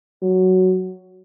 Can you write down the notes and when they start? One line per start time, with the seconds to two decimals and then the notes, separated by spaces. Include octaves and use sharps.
0.22 F#3